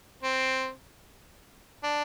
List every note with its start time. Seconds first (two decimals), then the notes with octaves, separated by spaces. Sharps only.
0.23 C4
1.83 D4